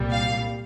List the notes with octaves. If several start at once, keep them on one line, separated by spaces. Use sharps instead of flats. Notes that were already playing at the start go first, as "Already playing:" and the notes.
Already playing: C2 A#2 G3
F5